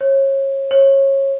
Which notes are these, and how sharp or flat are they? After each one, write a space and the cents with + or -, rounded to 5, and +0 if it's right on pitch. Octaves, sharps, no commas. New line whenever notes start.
C#5 -30
C#5 -25